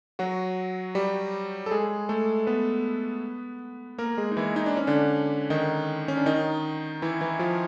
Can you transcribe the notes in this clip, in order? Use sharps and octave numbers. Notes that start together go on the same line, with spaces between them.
F#3 F#4
G3 G4
A4
G#3 G#4
A3 A4
B3 B4
A#3 A#4
G#3 G#4
D#4
E3 E4
D#4
D4
C#4
D3 D4
D#3 D#4
C#4
D4
D#3 D#4
E3 E4
E3 E4
F3 F4